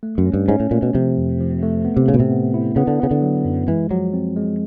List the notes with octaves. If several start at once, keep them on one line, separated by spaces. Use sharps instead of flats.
A3
F#2
C#4
G2
G#2 C#4
A2
A#2 A3
B2
C3 F3
F2
F3
A3
B3
C3
A2 C#3
B2
C3
B3
E4
C#3 B3
D3
C#3 B3
D3
F#3
F#2
E3 G#3
F3 F#3
C4
G#3